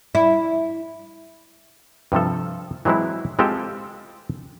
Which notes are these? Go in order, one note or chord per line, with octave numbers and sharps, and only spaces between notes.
E4
G2 C3 F3 A4
E3 F#3 G#3 C4 E4
G#3 C4 F4 G4 A4 C5